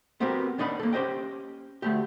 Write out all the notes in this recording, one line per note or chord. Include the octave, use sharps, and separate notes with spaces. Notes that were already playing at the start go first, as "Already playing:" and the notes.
B3 C4 F#4 G4 A4 A#4
D#2 D4 D#4 F#5 B5
A#3 A4
C#4 G4 C5 D#5 G5
D2 A3 G4